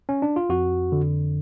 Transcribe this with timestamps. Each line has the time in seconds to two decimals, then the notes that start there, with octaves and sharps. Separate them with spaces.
0.09 C#4
0.22 D4
0.36 F4
0.49 F2 F#4
0.92 D3